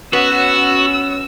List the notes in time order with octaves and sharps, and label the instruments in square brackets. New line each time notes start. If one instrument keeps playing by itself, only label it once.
[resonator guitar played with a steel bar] B3 [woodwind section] C#4 [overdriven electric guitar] F#4 [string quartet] E6